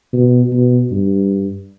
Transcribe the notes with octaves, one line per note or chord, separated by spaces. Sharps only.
B2
B2
G2